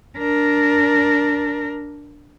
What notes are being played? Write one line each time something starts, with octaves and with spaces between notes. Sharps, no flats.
D4 A#4